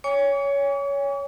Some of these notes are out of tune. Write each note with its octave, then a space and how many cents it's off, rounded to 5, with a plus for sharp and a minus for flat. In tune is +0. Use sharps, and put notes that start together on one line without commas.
C#5 +15 G#5 -35 C#6 +45